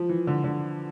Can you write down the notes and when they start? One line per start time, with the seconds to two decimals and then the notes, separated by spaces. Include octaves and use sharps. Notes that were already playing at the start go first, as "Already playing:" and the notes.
Already playing: F3
0.09 E3
0.27 D3
0.44 D3